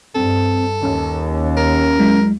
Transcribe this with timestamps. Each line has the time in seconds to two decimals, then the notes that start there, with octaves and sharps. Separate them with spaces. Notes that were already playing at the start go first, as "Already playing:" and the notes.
0.15 G2 C4 A4
0.83 D#2 C#4
1.57 A#4
1.99 F#3 G#3 E4